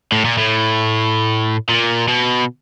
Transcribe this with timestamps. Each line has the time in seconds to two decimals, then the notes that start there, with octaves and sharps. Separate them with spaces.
0.12 A2
0.25 A#2
0.38 A2
1.69 A#2
2.08 B2